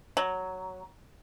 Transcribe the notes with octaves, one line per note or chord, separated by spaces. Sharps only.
F#3